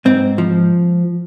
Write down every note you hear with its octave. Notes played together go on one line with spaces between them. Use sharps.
G#2 C4
F3